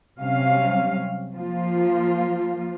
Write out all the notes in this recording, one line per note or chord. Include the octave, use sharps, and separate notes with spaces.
C3 F#3 G3 C#4 F5
F3 A#3 F4